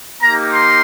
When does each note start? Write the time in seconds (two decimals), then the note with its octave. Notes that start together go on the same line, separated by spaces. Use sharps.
0.22 A#3 D#4 G4 A#5
0.53 C6